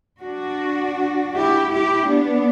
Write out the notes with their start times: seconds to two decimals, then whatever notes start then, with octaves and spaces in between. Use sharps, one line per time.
0.21 D4 F#4
1.34 E4 G4
1.72 E4 G4
2.09 B3 D4